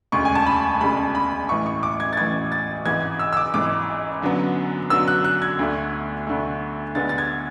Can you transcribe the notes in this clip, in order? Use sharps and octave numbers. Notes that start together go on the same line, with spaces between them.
E1 D2 C#3 G#3 C#6
G#5
A5
B5
E1 D2 C#3 G#3 B5
B5
A1 A2 E3 C#6
C#6
D6
G#6
A6
A1 A2 E3 G#6
A6
G#1 G#2 E3 G#6
E6
E6
D6
G#1 G#2 E3 D6
F#2 D3 F#3 B3
F#2 D3 F#3 B3 E6
F#6
F#6
G#6
D2 D3 A3
D2 D3 A3
D2 D3 G#3 B3 A6
A6
G#6